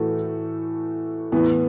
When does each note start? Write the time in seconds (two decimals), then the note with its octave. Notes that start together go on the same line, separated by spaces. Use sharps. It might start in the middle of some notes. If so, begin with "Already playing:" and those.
Already playing: A2 E3 A3 F#4 A4
1.32 A2 E3 B3